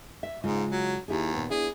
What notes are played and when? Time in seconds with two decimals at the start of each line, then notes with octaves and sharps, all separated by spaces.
0.23 E5
0.44 G#2 C#3 G#3 F4
0.71 F#3
1.08 D#2 E4 G4 G#4
1.34 A#2 B3
1.50 B3 D4 E4 G#4